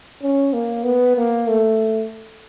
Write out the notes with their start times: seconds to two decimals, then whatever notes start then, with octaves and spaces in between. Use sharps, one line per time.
0.22 C#4
0.53 A#3
0.84 B3
1.16 A#3
1.48 A3